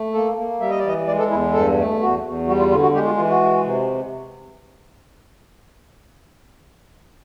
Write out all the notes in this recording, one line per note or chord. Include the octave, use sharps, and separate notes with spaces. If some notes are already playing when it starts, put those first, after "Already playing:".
Already playing: A3
A#3 A4
A#3
G3 E5
D#5
D5
E3 D#5
G#3 D5
A4
E2 E4
G2 A4
A3
E2 F#4
E2
G3 F#4
F4
D3 F4
F#4
G#3 G4
F4
E3 F4
F#4
G#3
C3